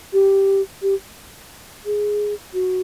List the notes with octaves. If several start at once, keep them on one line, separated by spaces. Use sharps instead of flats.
G4
G4
G#4
F#4